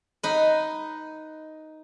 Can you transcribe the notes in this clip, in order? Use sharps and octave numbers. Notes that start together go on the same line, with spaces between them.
D#4 B4